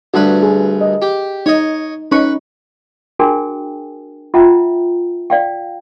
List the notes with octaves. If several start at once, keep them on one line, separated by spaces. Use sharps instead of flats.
D2 G2 F#4 B4
G#4
D#5
G4
D#4 C#5 D#5
C#4 D#4 B4 C#6
D4 F#4 G#4 A#4 G5 G#5
F4 E5 F#5 G5 A#5
D5 F5 G5